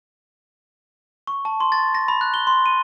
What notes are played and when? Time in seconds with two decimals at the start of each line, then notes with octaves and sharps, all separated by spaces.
1.27 C#6
1.45 A5
1.60 C6
1.72 A6
1.95 A#6
2.08 B5
2.21 F#6
2.34 G7
2.47 C6
2.66 D#7